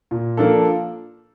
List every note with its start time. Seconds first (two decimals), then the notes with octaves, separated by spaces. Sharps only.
0.11 A#2
0.37 F3 A#3 D4 A4